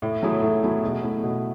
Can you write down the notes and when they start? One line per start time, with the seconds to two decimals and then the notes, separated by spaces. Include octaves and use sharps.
0.02 A2
0.23 F#3 A3 E4 G#4
0.42 A2
0.63 F#3 A3 E4 G#4
0.84 B2
1.03 A3 E4
1.23 B2